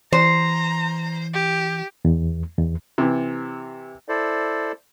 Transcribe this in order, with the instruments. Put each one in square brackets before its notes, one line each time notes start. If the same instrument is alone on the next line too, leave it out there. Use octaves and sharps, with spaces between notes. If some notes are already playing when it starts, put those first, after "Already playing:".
[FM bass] E3 [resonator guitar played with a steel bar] C5 [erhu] A#5
[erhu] G4
[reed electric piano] E2
E2
[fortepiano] C3 E3
[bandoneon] E4 A4 C5 D5